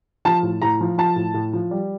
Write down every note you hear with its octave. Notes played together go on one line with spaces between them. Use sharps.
F3 A5
A2
A2 A#5
F3
F3 A5
A2
A2
F3
G3